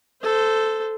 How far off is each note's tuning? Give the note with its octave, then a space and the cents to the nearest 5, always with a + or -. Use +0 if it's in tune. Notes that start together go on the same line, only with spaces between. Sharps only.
A4 +0 C5 -15